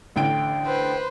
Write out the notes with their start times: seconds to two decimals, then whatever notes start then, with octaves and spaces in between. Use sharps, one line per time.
0.16 A1 D3 G5 D7
0.66 B4 C5